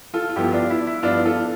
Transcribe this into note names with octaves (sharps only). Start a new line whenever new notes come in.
F4 A4
F4
G2 F3 B3 E4 G4
D4 F4
E4
E4
G2 F3 B3 D4 F4
F4 A4